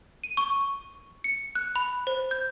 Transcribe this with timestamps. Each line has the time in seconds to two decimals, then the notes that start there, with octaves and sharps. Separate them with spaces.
0.24 D#7
0.37 C#6
1.24 C#7
1.55 F#6
1.76 B5
2.07 C5
2.31 G6